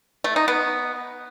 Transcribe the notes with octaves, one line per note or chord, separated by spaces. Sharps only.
A3
D#4
B3